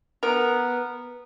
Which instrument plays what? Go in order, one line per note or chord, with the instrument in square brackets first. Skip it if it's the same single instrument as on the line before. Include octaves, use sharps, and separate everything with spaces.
[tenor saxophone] B3 [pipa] A#4